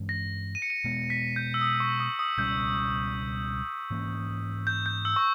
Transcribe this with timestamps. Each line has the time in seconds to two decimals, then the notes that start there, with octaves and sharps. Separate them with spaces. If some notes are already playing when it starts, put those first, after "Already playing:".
Already playing: G2 E3 G#3 C#4
0.09 A#6
0.55 D#7
0.62 C#7
0.70 D#7
0.84 B2 G#3 B3 C#7
1.10 B6
1.36 G6
1.54 E6
1.61 D#6
1.80 C#6
2.00 D#6
2.19 D#6
2.38 C#2 B2 G3 C#4 G6
3.91 G#2 E3 A#3 C#4
4.67 G6
4.86 G6
5.05 E6
5.16 C#6